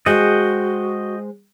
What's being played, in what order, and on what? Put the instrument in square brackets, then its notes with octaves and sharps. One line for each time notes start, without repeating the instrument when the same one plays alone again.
[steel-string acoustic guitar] G#3 C5 [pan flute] F#4 [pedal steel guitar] D#5 F#5 G5